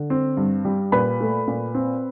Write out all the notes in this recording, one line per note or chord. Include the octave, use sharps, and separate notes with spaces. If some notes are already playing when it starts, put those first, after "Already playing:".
Already playing: D3
C4
G2
G3
A#2 B4 B5
A3
A#2
C4